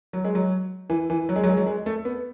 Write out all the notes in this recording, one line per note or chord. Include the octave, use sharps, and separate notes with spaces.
F#3
G#3
F#3
E3
E3
F#3
G#3
F#3
G#3
F#3
G#3
A3
B3